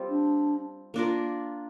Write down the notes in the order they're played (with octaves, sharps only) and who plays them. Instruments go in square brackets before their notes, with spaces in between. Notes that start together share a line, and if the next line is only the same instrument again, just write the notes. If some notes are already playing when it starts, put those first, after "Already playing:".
Already playing: [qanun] G3 C4 F4
[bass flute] D4
[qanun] A#3 D4 F4 A#4